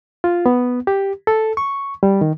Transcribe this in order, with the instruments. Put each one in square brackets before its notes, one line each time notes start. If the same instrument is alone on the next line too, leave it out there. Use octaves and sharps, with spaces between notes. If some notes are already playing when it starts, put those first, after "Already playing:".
[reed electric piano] F4
B3
G4
A4
C#6
G3
D#3